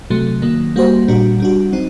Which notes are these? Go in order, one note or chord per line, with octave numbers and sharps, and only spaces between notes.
C3 F#3 A3
D#3 F#3 A#3
G3 A#3 F#4 C5
A#2 G3 D4 F#4
G3 D4 F#4
F#3 C4 D#4